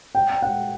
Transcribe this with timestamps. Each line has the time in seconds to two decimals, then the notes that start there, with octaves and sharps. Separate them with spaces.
0.15 G5
0.42 F#5